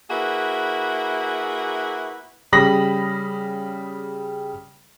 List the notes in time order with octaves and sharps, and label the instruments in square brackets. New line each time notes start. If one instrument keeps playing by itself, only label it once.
[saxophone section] A#3 E4 F#4 G#4 B4
[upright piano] C#3 G3 B5 D#6 A#6 F#7